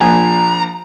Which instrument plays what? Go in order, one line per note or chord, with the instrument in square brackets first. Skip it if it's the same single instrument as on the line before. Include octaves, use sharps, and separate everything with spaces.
[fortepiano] A#1 [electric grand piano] F3 A#3 D4 [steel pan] G#5 [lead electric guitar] A#5